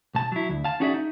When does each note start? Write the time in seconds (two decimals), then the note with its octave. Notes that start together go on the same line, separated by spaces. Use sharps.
0.15 B1 A5
0.32 F#3 E4
0.49 D2
0.64 F5 A5
0.80 C#4 D#4 F#4 G#4 D5 E5
0.94 D#4